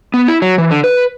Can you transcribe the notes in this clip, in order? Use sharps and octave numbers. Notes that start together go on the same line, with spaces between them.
B3
E4
F#3
E3
D3
B4